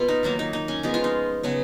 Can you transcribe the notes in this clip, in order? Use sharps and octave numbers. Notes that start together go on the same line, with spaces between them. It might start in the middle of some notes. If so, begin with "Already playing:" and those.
Already playing: B2 B3 F4 B4
D#4
D#3 F#3 A#3 D#4
D#4
D#4
C#4
F3 G#3 B3 D#4
F4
D#4
C#3 F#3 B3